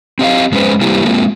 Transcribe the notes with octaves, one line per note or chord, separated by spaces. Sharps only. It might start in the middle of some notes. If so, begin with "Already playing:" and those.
C4 G4 D#5 F5
F#2 G#3 C#4 B4 C5
G3 A#3 E4 G4
G#3 A#3 C4 F4